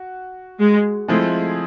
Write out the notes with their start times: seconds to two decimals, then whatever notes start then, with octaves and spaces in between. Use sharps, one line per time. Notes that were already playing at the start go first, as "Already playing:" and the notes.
Already playing: F#4
0.59 G#3
1.08 F3 G#3 A3 C4 E4 G#4